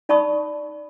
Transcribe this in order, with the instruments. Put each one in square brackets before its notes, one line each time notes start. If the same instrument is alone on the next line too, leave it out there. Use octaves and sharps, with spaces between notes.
[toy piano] D#4 D5 A5 B5 C#6 D#6